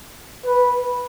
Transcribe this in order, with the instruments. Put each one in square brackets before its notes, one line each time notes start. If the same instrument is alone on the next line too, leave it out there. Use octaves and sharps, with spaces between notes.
[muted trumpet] B4